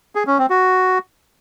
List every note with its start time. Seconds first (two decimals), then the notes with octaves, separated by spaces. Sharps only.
0.15 G#4
0.27 C#4
0.38 C4
0.50 F#4